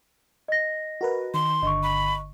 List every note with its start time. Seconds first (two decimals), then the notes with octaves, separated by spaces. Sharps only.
0.48 D#5 A#6
1.01 F#4 A#4 B4
1.34 D#3 C6
1.62 G1 D3 D#5 C#6
1.83 B5